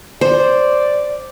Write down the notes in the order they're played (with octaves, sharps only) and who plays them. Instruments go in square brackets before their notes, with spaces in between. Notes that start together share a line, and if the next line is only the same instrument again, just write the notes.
[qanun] C5 [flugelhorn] D5